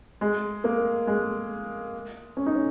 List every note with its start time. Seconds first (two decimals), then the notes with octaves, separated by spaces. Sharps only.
0.21 G#3
0.64 A#3
1.07 G#3
2.37 C#4
2.46 D#4
2.54 C#4